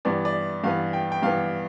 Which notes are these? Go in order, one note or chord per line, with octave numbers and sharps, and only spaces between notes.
G2 E3 B3 D5
D5
G2 E3 B3 F5
G5
G5
G2 E3 B3 F5